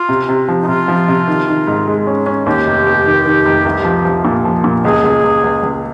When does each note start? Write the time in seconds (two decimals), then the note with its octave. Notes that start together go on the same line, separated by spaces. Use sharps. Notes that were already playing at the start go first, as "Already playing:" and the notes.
Already playing: F4
0.09 C3
0.29 C3
0.48 F3
0.62 D#4
0.68 C3 F4
0.88 F3
1.08 C3
1.28 D#3
1.48 D#3
1.67 G#2
1.87 G#3
2.07 C#4
2.26 C#4
2.46 D#2 G4
2.66 F1
2.86 F1
3.06 D#3
3.26 D#3
3.45 F1
3.65 C2
3.85 F3
4.05 F3
4.25 A#2
4.45 F3
4.64 A#2
4.84 C#2 G#4
5.04 C#2
5.24 C#2
5.44 C#2
5.63 C#2